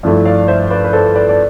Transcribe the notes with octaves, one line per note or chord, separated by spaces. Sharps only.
G2 F3 A3 E4
D5 F5
C5 E5
B4 D5
B4
A4 C5
B4 D5
D5